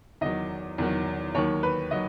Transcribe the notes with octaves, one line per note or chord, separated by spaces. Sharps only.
E2 D#3 F#3 D#5
E2 D#3 F#3
D#2 D#3 F#3 C#5
B4
D#3 F#3 D#5